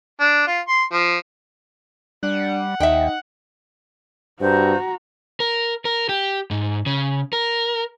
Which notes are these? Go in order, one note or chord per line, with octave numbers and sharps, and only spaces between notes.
D4
F4
C6
F3
G3 D4 F#5
D#2 D#4 E5 G5
G2 F#4 C5 A#5
A#4
A#4
G4
G#2
C#3
A#4